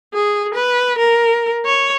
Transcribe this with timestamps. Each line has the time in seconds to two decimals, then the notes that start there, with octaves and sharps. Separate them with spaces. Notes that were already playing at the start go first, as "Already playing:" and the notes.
0.14 G#4
0.55 B4
0.98 A#4
1.66 C#5